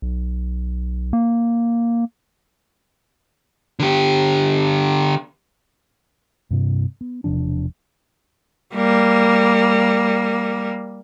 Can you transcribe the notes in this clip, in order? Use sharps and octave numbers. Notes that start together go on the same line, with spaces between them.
B1
A#3
D3 G4
G2 C3
B3
E1 C3 F3 D4
G3 A#3